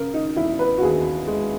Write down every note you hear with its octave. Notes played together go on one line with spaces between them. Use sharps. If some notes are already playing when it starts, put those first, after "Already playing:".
Already playing: C#3 A#4
D#4
E1 E4
B4
F#4
D#2 G#4
G#3